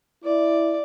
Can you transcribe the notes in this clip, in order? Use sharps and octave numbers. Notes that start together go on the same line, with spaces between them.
E4 D5